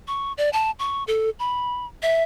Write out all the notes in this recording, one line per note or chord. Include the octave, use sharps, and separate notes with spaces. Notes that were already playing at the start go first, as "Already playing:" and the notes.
C#6
D5
A5
C#6
A4
B5
E5